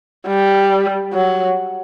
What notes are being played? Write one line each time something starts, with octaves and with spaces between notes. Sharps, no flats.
G3
F#3